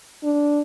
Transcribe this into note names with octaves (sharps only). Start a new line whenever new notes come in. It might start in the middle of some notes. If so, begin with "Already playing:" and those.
D4